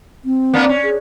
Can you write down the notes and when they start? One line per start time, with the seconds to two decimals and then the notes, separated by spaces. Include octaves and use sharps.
0.25 C4
0.54 A#3 B3 D4
0.69 C#4
0.84 G#4